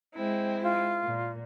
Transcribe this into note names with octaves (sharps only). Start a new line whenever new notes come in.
G#3 C4 E4
F4
A#2